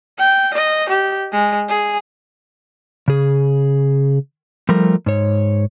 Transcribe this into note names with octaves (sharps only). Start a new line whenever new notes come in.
G5
D#5
G4
G#3
G#4
C#3 G#4
F3 G3 A3 A#4
G#2 C#5